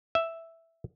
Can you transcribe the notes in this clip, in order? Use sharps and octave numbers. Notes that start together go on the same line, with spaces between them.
E5